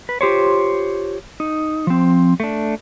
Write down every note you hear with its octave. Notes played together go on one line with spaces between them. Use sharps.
B4
F4 G4 C5 C#5
D#4
F3 C4
A3 D4